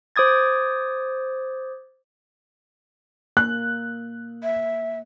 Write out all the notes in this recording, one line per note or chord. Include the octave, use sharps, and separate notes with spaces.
C5 D6 D#6 G#6 A6
A#3 F#6
E5